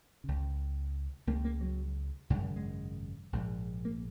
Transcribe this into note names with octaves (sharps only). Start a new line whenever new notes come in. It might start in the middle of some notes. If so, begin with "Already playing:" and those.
C#2 C#3
C#2 C#3 A#3
A#3
F#3
G#1 F#2 C#3 G#3
G#3
A#1 G#2
A#3